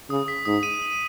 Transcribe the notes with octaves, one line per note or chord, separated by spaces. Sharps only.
C#3 D#6
B6
G#2 D#6
D#7
F#7